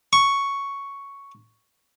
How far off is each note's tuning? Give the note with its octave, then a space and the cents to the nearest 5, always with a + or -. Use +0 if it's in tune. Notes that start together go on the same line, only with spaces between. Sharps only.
C#6 +5